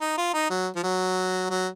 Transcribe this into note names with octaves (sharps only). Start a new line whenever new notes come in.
D#4
F4
D#4
F#3
F3
F#3
F#3